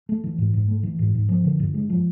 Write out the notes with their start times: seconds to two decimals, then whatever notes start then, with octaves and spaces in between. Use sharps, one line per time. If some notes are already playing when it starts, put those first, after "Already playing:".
0.09 A3
0.24 E3
0.38 G#2
0.54 G#2
0.68 A3
0.83 E3
0.99 G#2
1.15 G#2
1.29 F3
1.44 D3
1.59 G2
1.74 G#3
1.90 F3